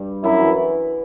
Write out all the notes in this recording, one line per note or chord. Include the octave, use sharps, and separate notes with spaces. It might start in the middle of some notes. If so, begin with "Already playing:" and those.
Already playing: G2 G3
F#2 F#3 E4
E3